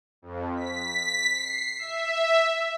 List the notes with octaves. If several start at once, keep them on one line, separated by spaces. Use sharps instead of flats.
F2
B6
C7
E5